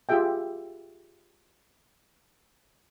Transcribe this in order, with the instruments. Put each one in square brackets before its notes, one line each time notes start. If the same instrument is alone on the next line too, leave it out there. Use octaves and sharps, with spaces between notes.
[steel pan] F4 G4 G#4 E5 G5